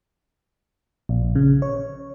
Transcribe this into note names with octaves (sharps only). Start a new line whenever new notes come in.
A#1
C#3
C#5